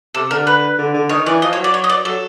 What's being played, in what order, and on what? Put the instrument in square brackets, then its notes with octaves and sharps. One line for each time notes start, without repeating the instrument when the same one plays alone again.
[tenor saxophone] C3 [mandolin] A4
[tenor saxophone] D3 [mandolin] A#4
[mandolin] B4
[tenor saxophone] D3
D3
[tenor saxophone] D#3 [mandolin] C#5
[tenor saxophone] E3 [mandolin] D5
[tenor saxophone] F3 [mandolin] D#5
[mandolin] C#5
[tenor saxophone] F#3
[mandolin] D5
C#5
D#5
D5
[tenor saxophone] F#3 [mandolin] A4